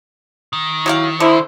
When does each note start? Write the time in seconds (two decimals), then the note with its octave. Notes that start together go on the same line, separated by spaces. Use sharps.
0.53 D#3
0.86 F#3 E4 G4 F5
1.20 D3 E4 C5